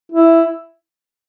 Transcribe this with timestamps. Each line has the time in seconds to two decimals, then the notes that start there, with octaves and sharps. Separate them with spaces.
0.12 E4